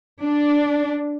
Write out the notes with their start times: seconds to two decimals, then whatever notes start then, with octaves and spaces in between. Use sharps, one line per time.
0.22 D4